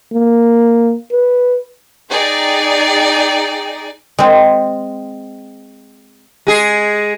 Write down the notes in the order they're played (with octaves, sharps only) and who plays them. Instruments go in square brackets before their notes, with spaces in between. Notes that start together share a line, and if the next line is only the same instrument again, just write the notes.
[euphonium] A#3
B4
[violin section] D#4 G#4 D5 G5
[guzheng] G#3 C4
[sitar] G#3 G#4